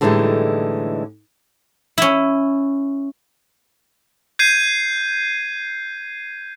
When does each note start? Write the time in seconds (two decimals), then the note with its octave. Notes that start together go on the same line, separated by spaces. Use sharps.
0.01 A2 D3 E3 G3 G#3 D#4
1.98 C#4 E4
4.39 G6 G#6 C7 D#7